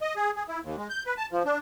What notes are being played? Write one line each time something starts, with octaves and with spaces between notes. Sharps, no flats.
D#5
G#4
G#4
E4
D#2
G#3
G6
B4
A5
F3
D4